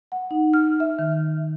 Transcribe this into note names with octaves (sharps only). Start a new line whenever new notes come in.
F#5
D#4
F6
E5
D#3